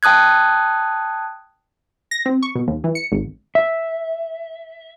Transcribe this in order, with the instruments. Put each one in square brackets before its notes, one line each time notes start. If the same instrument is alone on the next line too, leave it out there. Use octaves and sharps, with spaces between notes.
[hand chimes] G5 A5 D#6 F#6 G#6
[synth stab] A#6
C4
C#6
B2
D#2
E3
C#7
G#1
[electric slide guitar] E5